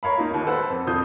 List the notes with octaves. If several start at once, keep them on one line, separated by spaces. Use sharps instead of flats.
A#4 C#5 F5 B5
A#3 D#4 F4
D#2
A4 B4 C5 F#5
F2
E1 F2 F4 D#6 G6